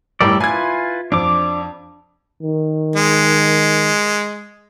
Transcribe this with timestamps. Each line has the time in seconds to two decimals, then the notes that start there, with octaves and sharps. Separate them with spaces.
0.21 A2 G3 A4 A#4 D5
0.40 E4 F4 B4 G#5 G#6
1.12 F2 D4 D6
2.43 D#3
2.96 G#3